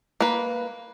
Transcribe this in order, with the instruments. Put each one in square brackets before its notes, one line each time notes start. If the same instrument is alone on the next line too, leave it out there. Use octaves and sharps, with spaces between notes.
[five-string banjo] A#3 B4